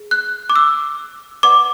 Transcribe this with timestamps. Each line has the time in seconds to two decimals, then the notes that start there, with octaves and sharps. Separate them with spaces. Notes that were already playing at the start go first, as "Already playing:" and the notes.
Already playing: G#4
0.11 F#6
0.50 D6
0.56 E6
1.43 B4 D5 F#5 D6